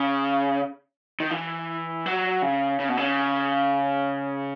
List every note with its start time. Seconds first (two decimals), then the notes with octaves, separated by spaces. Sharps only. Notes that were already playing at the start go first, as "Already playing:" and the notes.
Already playing: C#3
1.20 D#3
1.31 E3
2.06 F#3
2.42 C#3
2.80 C#3
2.89 B2
2.97 C#3